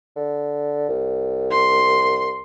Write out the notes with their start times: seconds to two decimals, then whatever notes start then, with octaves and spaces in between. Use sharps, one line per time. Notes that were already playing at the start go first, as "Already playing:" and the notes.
0.16 D3
0.89 C2
1.50 C6